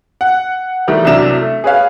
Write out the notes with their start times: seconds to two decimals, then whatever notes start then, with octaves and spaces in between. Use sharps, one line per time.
0.21 F#5
0.87 D#3 E3 G3 A3
1.05 C2 C3 F#3 D4 A#5 E7
1.37 A3
1.64 G#4 B4 C#5 F5